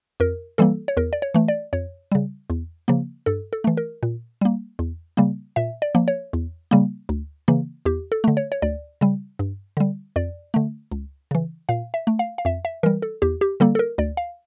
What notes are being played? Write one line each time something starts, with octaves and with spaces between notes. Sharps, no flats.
F2 A#4
E3 G3 A#3 A4
C#5
E2 A#4
D5
C#5
E3 A3
D5
F2 C#5
C#3 G3
E2
C#3 F3 A#3
G2 A4
A4
E3 A3
A#4
A#2
G3 A#3
E2
C#3 G3 A#3
A#2 E5
D5
F3 A#3
C#5
E2
C#3 G3 A#3
D2
C#3 E3 A#3
E2 G4
A4
D3 A3
C#5
C#5
D2 D5
C#3 G3
G2
D3 G3
F2 D5
D3 A3
C#2
C#3 E3
A#2 F5
E5
A3
F5
F5
F2 E5
E5
E3 G3 A#4
A4
E2 G4
G4
D3 G3 A#3 A4
A4
A#4
D2 D5
F5